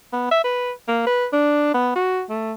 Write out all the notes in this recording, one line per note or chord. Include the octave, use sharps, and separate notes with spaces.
B3
E5
B4
A#3
B4
D4
B3
F#4
A3